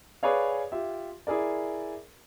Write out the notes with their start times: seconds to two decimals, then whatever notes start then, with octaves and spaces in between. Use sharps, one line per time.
0.23 G#4 B4 C#5 D5 F5
0.72 F4 G4 E5
1.27 E4 G#4 A#4 D5